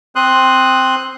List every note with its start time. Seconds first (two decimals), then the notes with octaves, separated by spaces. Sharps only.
0.16 C4 C6 D#6 F#6